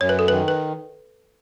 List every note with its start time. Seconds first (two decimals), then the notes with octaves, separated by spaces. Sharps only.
0.01 F#2 C#5
0.09 B4
0.19 A4
0.28 B4
0.32 D#3
0.48 B4